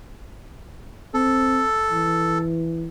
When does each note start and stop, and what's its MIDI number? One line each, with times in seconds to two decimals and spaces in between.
1.14 1.63 60
1.14 2.38 69
1.92 2.88 52